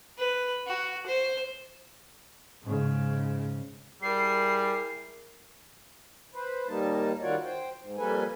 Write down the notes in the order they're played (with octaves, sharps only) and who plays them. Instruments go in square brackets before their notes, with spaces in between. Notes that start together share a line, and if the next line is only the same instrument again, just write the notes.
[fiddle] B4
F#4
C5
[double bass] G#2 C#3
[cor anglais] G3 [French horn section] E4 G#4 A#4 [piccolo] C7
[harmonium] B4 C5
D#2 G3 A#3 D#4 A5
D#3 G3 F4 F#4 C#5 D5
C5 G5
G#2
F2 G3 A#3 A4 B4 G#5